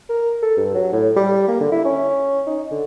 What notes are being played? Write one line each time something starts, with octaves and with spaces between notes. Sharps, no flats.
A#4
A4
G2
F#3
A2
G3
A#3
D3
E4
C#4
D#4
D3